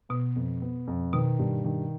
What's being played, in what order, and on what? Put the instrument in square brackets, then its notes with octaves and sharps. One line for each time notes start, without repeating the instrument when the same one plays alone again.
[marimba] B2 [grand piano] B3
[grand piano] F2
B3
F2
[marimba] B2 [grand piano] D#3
[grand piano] G2
D#3